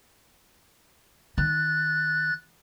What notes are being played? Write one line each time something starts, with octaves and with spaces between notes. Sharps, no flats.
D#3 F#6 A6